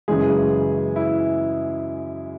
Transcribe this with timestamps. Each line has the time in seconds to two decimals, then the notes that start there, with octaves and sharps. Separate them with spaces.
0.08 F#2 C#3 E3 G#3 G#4
0.96 E4